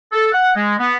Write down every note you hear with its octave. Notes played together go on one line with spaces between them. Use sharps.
A4
F#5
G#3
B3